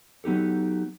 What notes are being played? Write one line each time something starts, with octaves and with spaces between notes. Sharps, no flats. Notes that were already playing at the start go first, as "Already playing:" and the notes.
F#3 B3 D#4 G4 A4